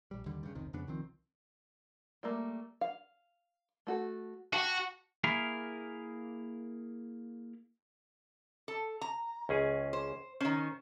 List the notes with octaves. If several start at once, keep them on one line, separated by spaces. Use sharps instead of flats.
A#1 G3
D#2 D3 G3
G2 C#3
F1 C#2 C3 D#3
F2 C#3 B3 D4
C2 D#3 F3 C4
G3 A3 A#3
F5
A3 F#4 A4
F#4 G4 F5 A5
A#3 E4 G#4 A#4
A4
A#5
C#2 C#4 G#4
C5
D#3 C#4 C5